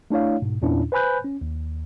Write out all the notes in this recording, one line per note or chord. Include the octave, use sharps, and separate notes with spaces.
A3 D4 E4 C#5 F5
G#2 B2
E2 A#2 C#4 D4 E4
B4 C5 G#5 B5 F#6 G6
C#4
D#2